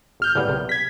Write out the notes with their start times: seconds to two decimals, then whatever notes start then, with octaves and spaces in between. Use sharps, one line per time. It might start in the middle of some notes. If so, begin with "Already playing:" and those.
0.20 G#1 F6 G6
0.35 A2 C#3 G3 B3
0.48 B1 C3
0.69 G#6 B6